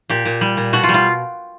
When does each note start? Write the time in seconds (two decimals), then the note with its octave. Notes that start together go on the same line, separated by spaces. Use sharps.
0.09 A#2 G4
0.25 A#2
0.41 G3
0.57 A#2
0.73 B2 F#4
0.83 F4
0.89 G3
0.94 F4